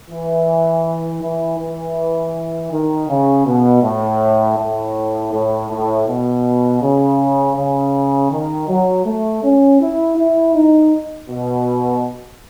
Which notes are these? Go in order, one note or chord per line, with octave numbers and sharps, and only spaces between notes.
E3
E3
E3
D#3
C#3
B2
A2
A2
A2
A2
B2
C#3
C#3
D#3
F#3
A3
C#4
E4
E4
D#4
B2